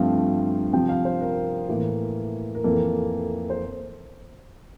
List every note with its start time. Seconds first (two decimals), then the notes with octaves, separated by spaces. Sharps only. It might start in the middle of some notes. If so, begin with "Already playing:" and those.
Already playing: G2 F3 A3 C4 F5
0.73 C3 F3 C4 G5
0.89 F5
1.05 C5
1.21 A#4
1.69 A2 E3 A#3
2.55 A#4
2.64 F2 E3 A#3 A4
3.50 C5